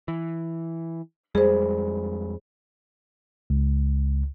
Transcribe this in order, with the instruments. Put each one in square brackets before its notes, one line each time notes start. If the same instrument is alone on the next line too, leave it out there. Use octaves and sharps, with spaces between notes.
[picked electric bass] E3
[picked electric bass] F2 G3 G#3 [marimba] G#4 C5
[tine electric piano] C#2